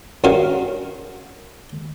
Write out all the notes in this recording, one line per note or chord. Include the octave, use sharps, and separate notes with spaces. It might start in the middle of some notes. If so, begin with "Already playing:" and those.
G2 C#4 F#4 A#4 F5